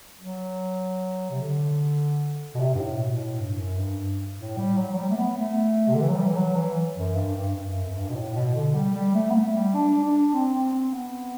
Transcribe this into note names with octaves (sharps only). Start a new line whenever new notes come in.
F#3
C3
D3
B2
C3
G2
A2
B2
A2
G2
F#2
G2
A2
G3
F#3
F#3
G3
A3
B3
A3
C3
D3
E3
F#3
G3
E3
F#3
E3
F#2
G2
G2
G2
F#2
F#2
G2
B2
A2
B2
D3
G3
G3
A3
B3
A3
G3
D4
D4
C4
C4
C4
B3